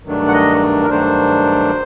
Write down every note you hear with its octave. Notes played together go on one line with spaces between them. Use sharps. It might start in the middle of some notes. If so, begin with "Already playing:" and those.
G2 D#3 F#3 A3 D4
F#5
D#5
A#4
G2 D#3 F#3 A3 D4 C5